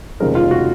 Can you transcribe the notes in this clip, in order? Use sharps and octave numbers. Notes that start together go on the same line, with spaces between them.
F1 D#2 C#3 F3 G#3 A#4
F4
F#4